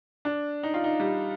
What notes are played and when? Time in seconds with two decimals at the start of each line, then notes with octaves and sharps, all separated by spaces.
0.25 D4
0.63 D#4
0.74 F4
0.84 D#4
1.00 G3